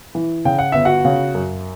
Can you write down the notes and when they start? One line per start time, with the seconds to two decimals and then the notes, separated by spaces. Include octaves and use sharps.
0.15 E3
0.45 C#3 G5
0.59 F#5
0.72 G1 E5
0.85 F#4 F#5
1.05 C#3
1.35 F#2